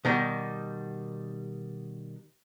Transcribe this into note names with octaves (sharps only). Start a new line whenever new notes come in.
B2 D#3 G3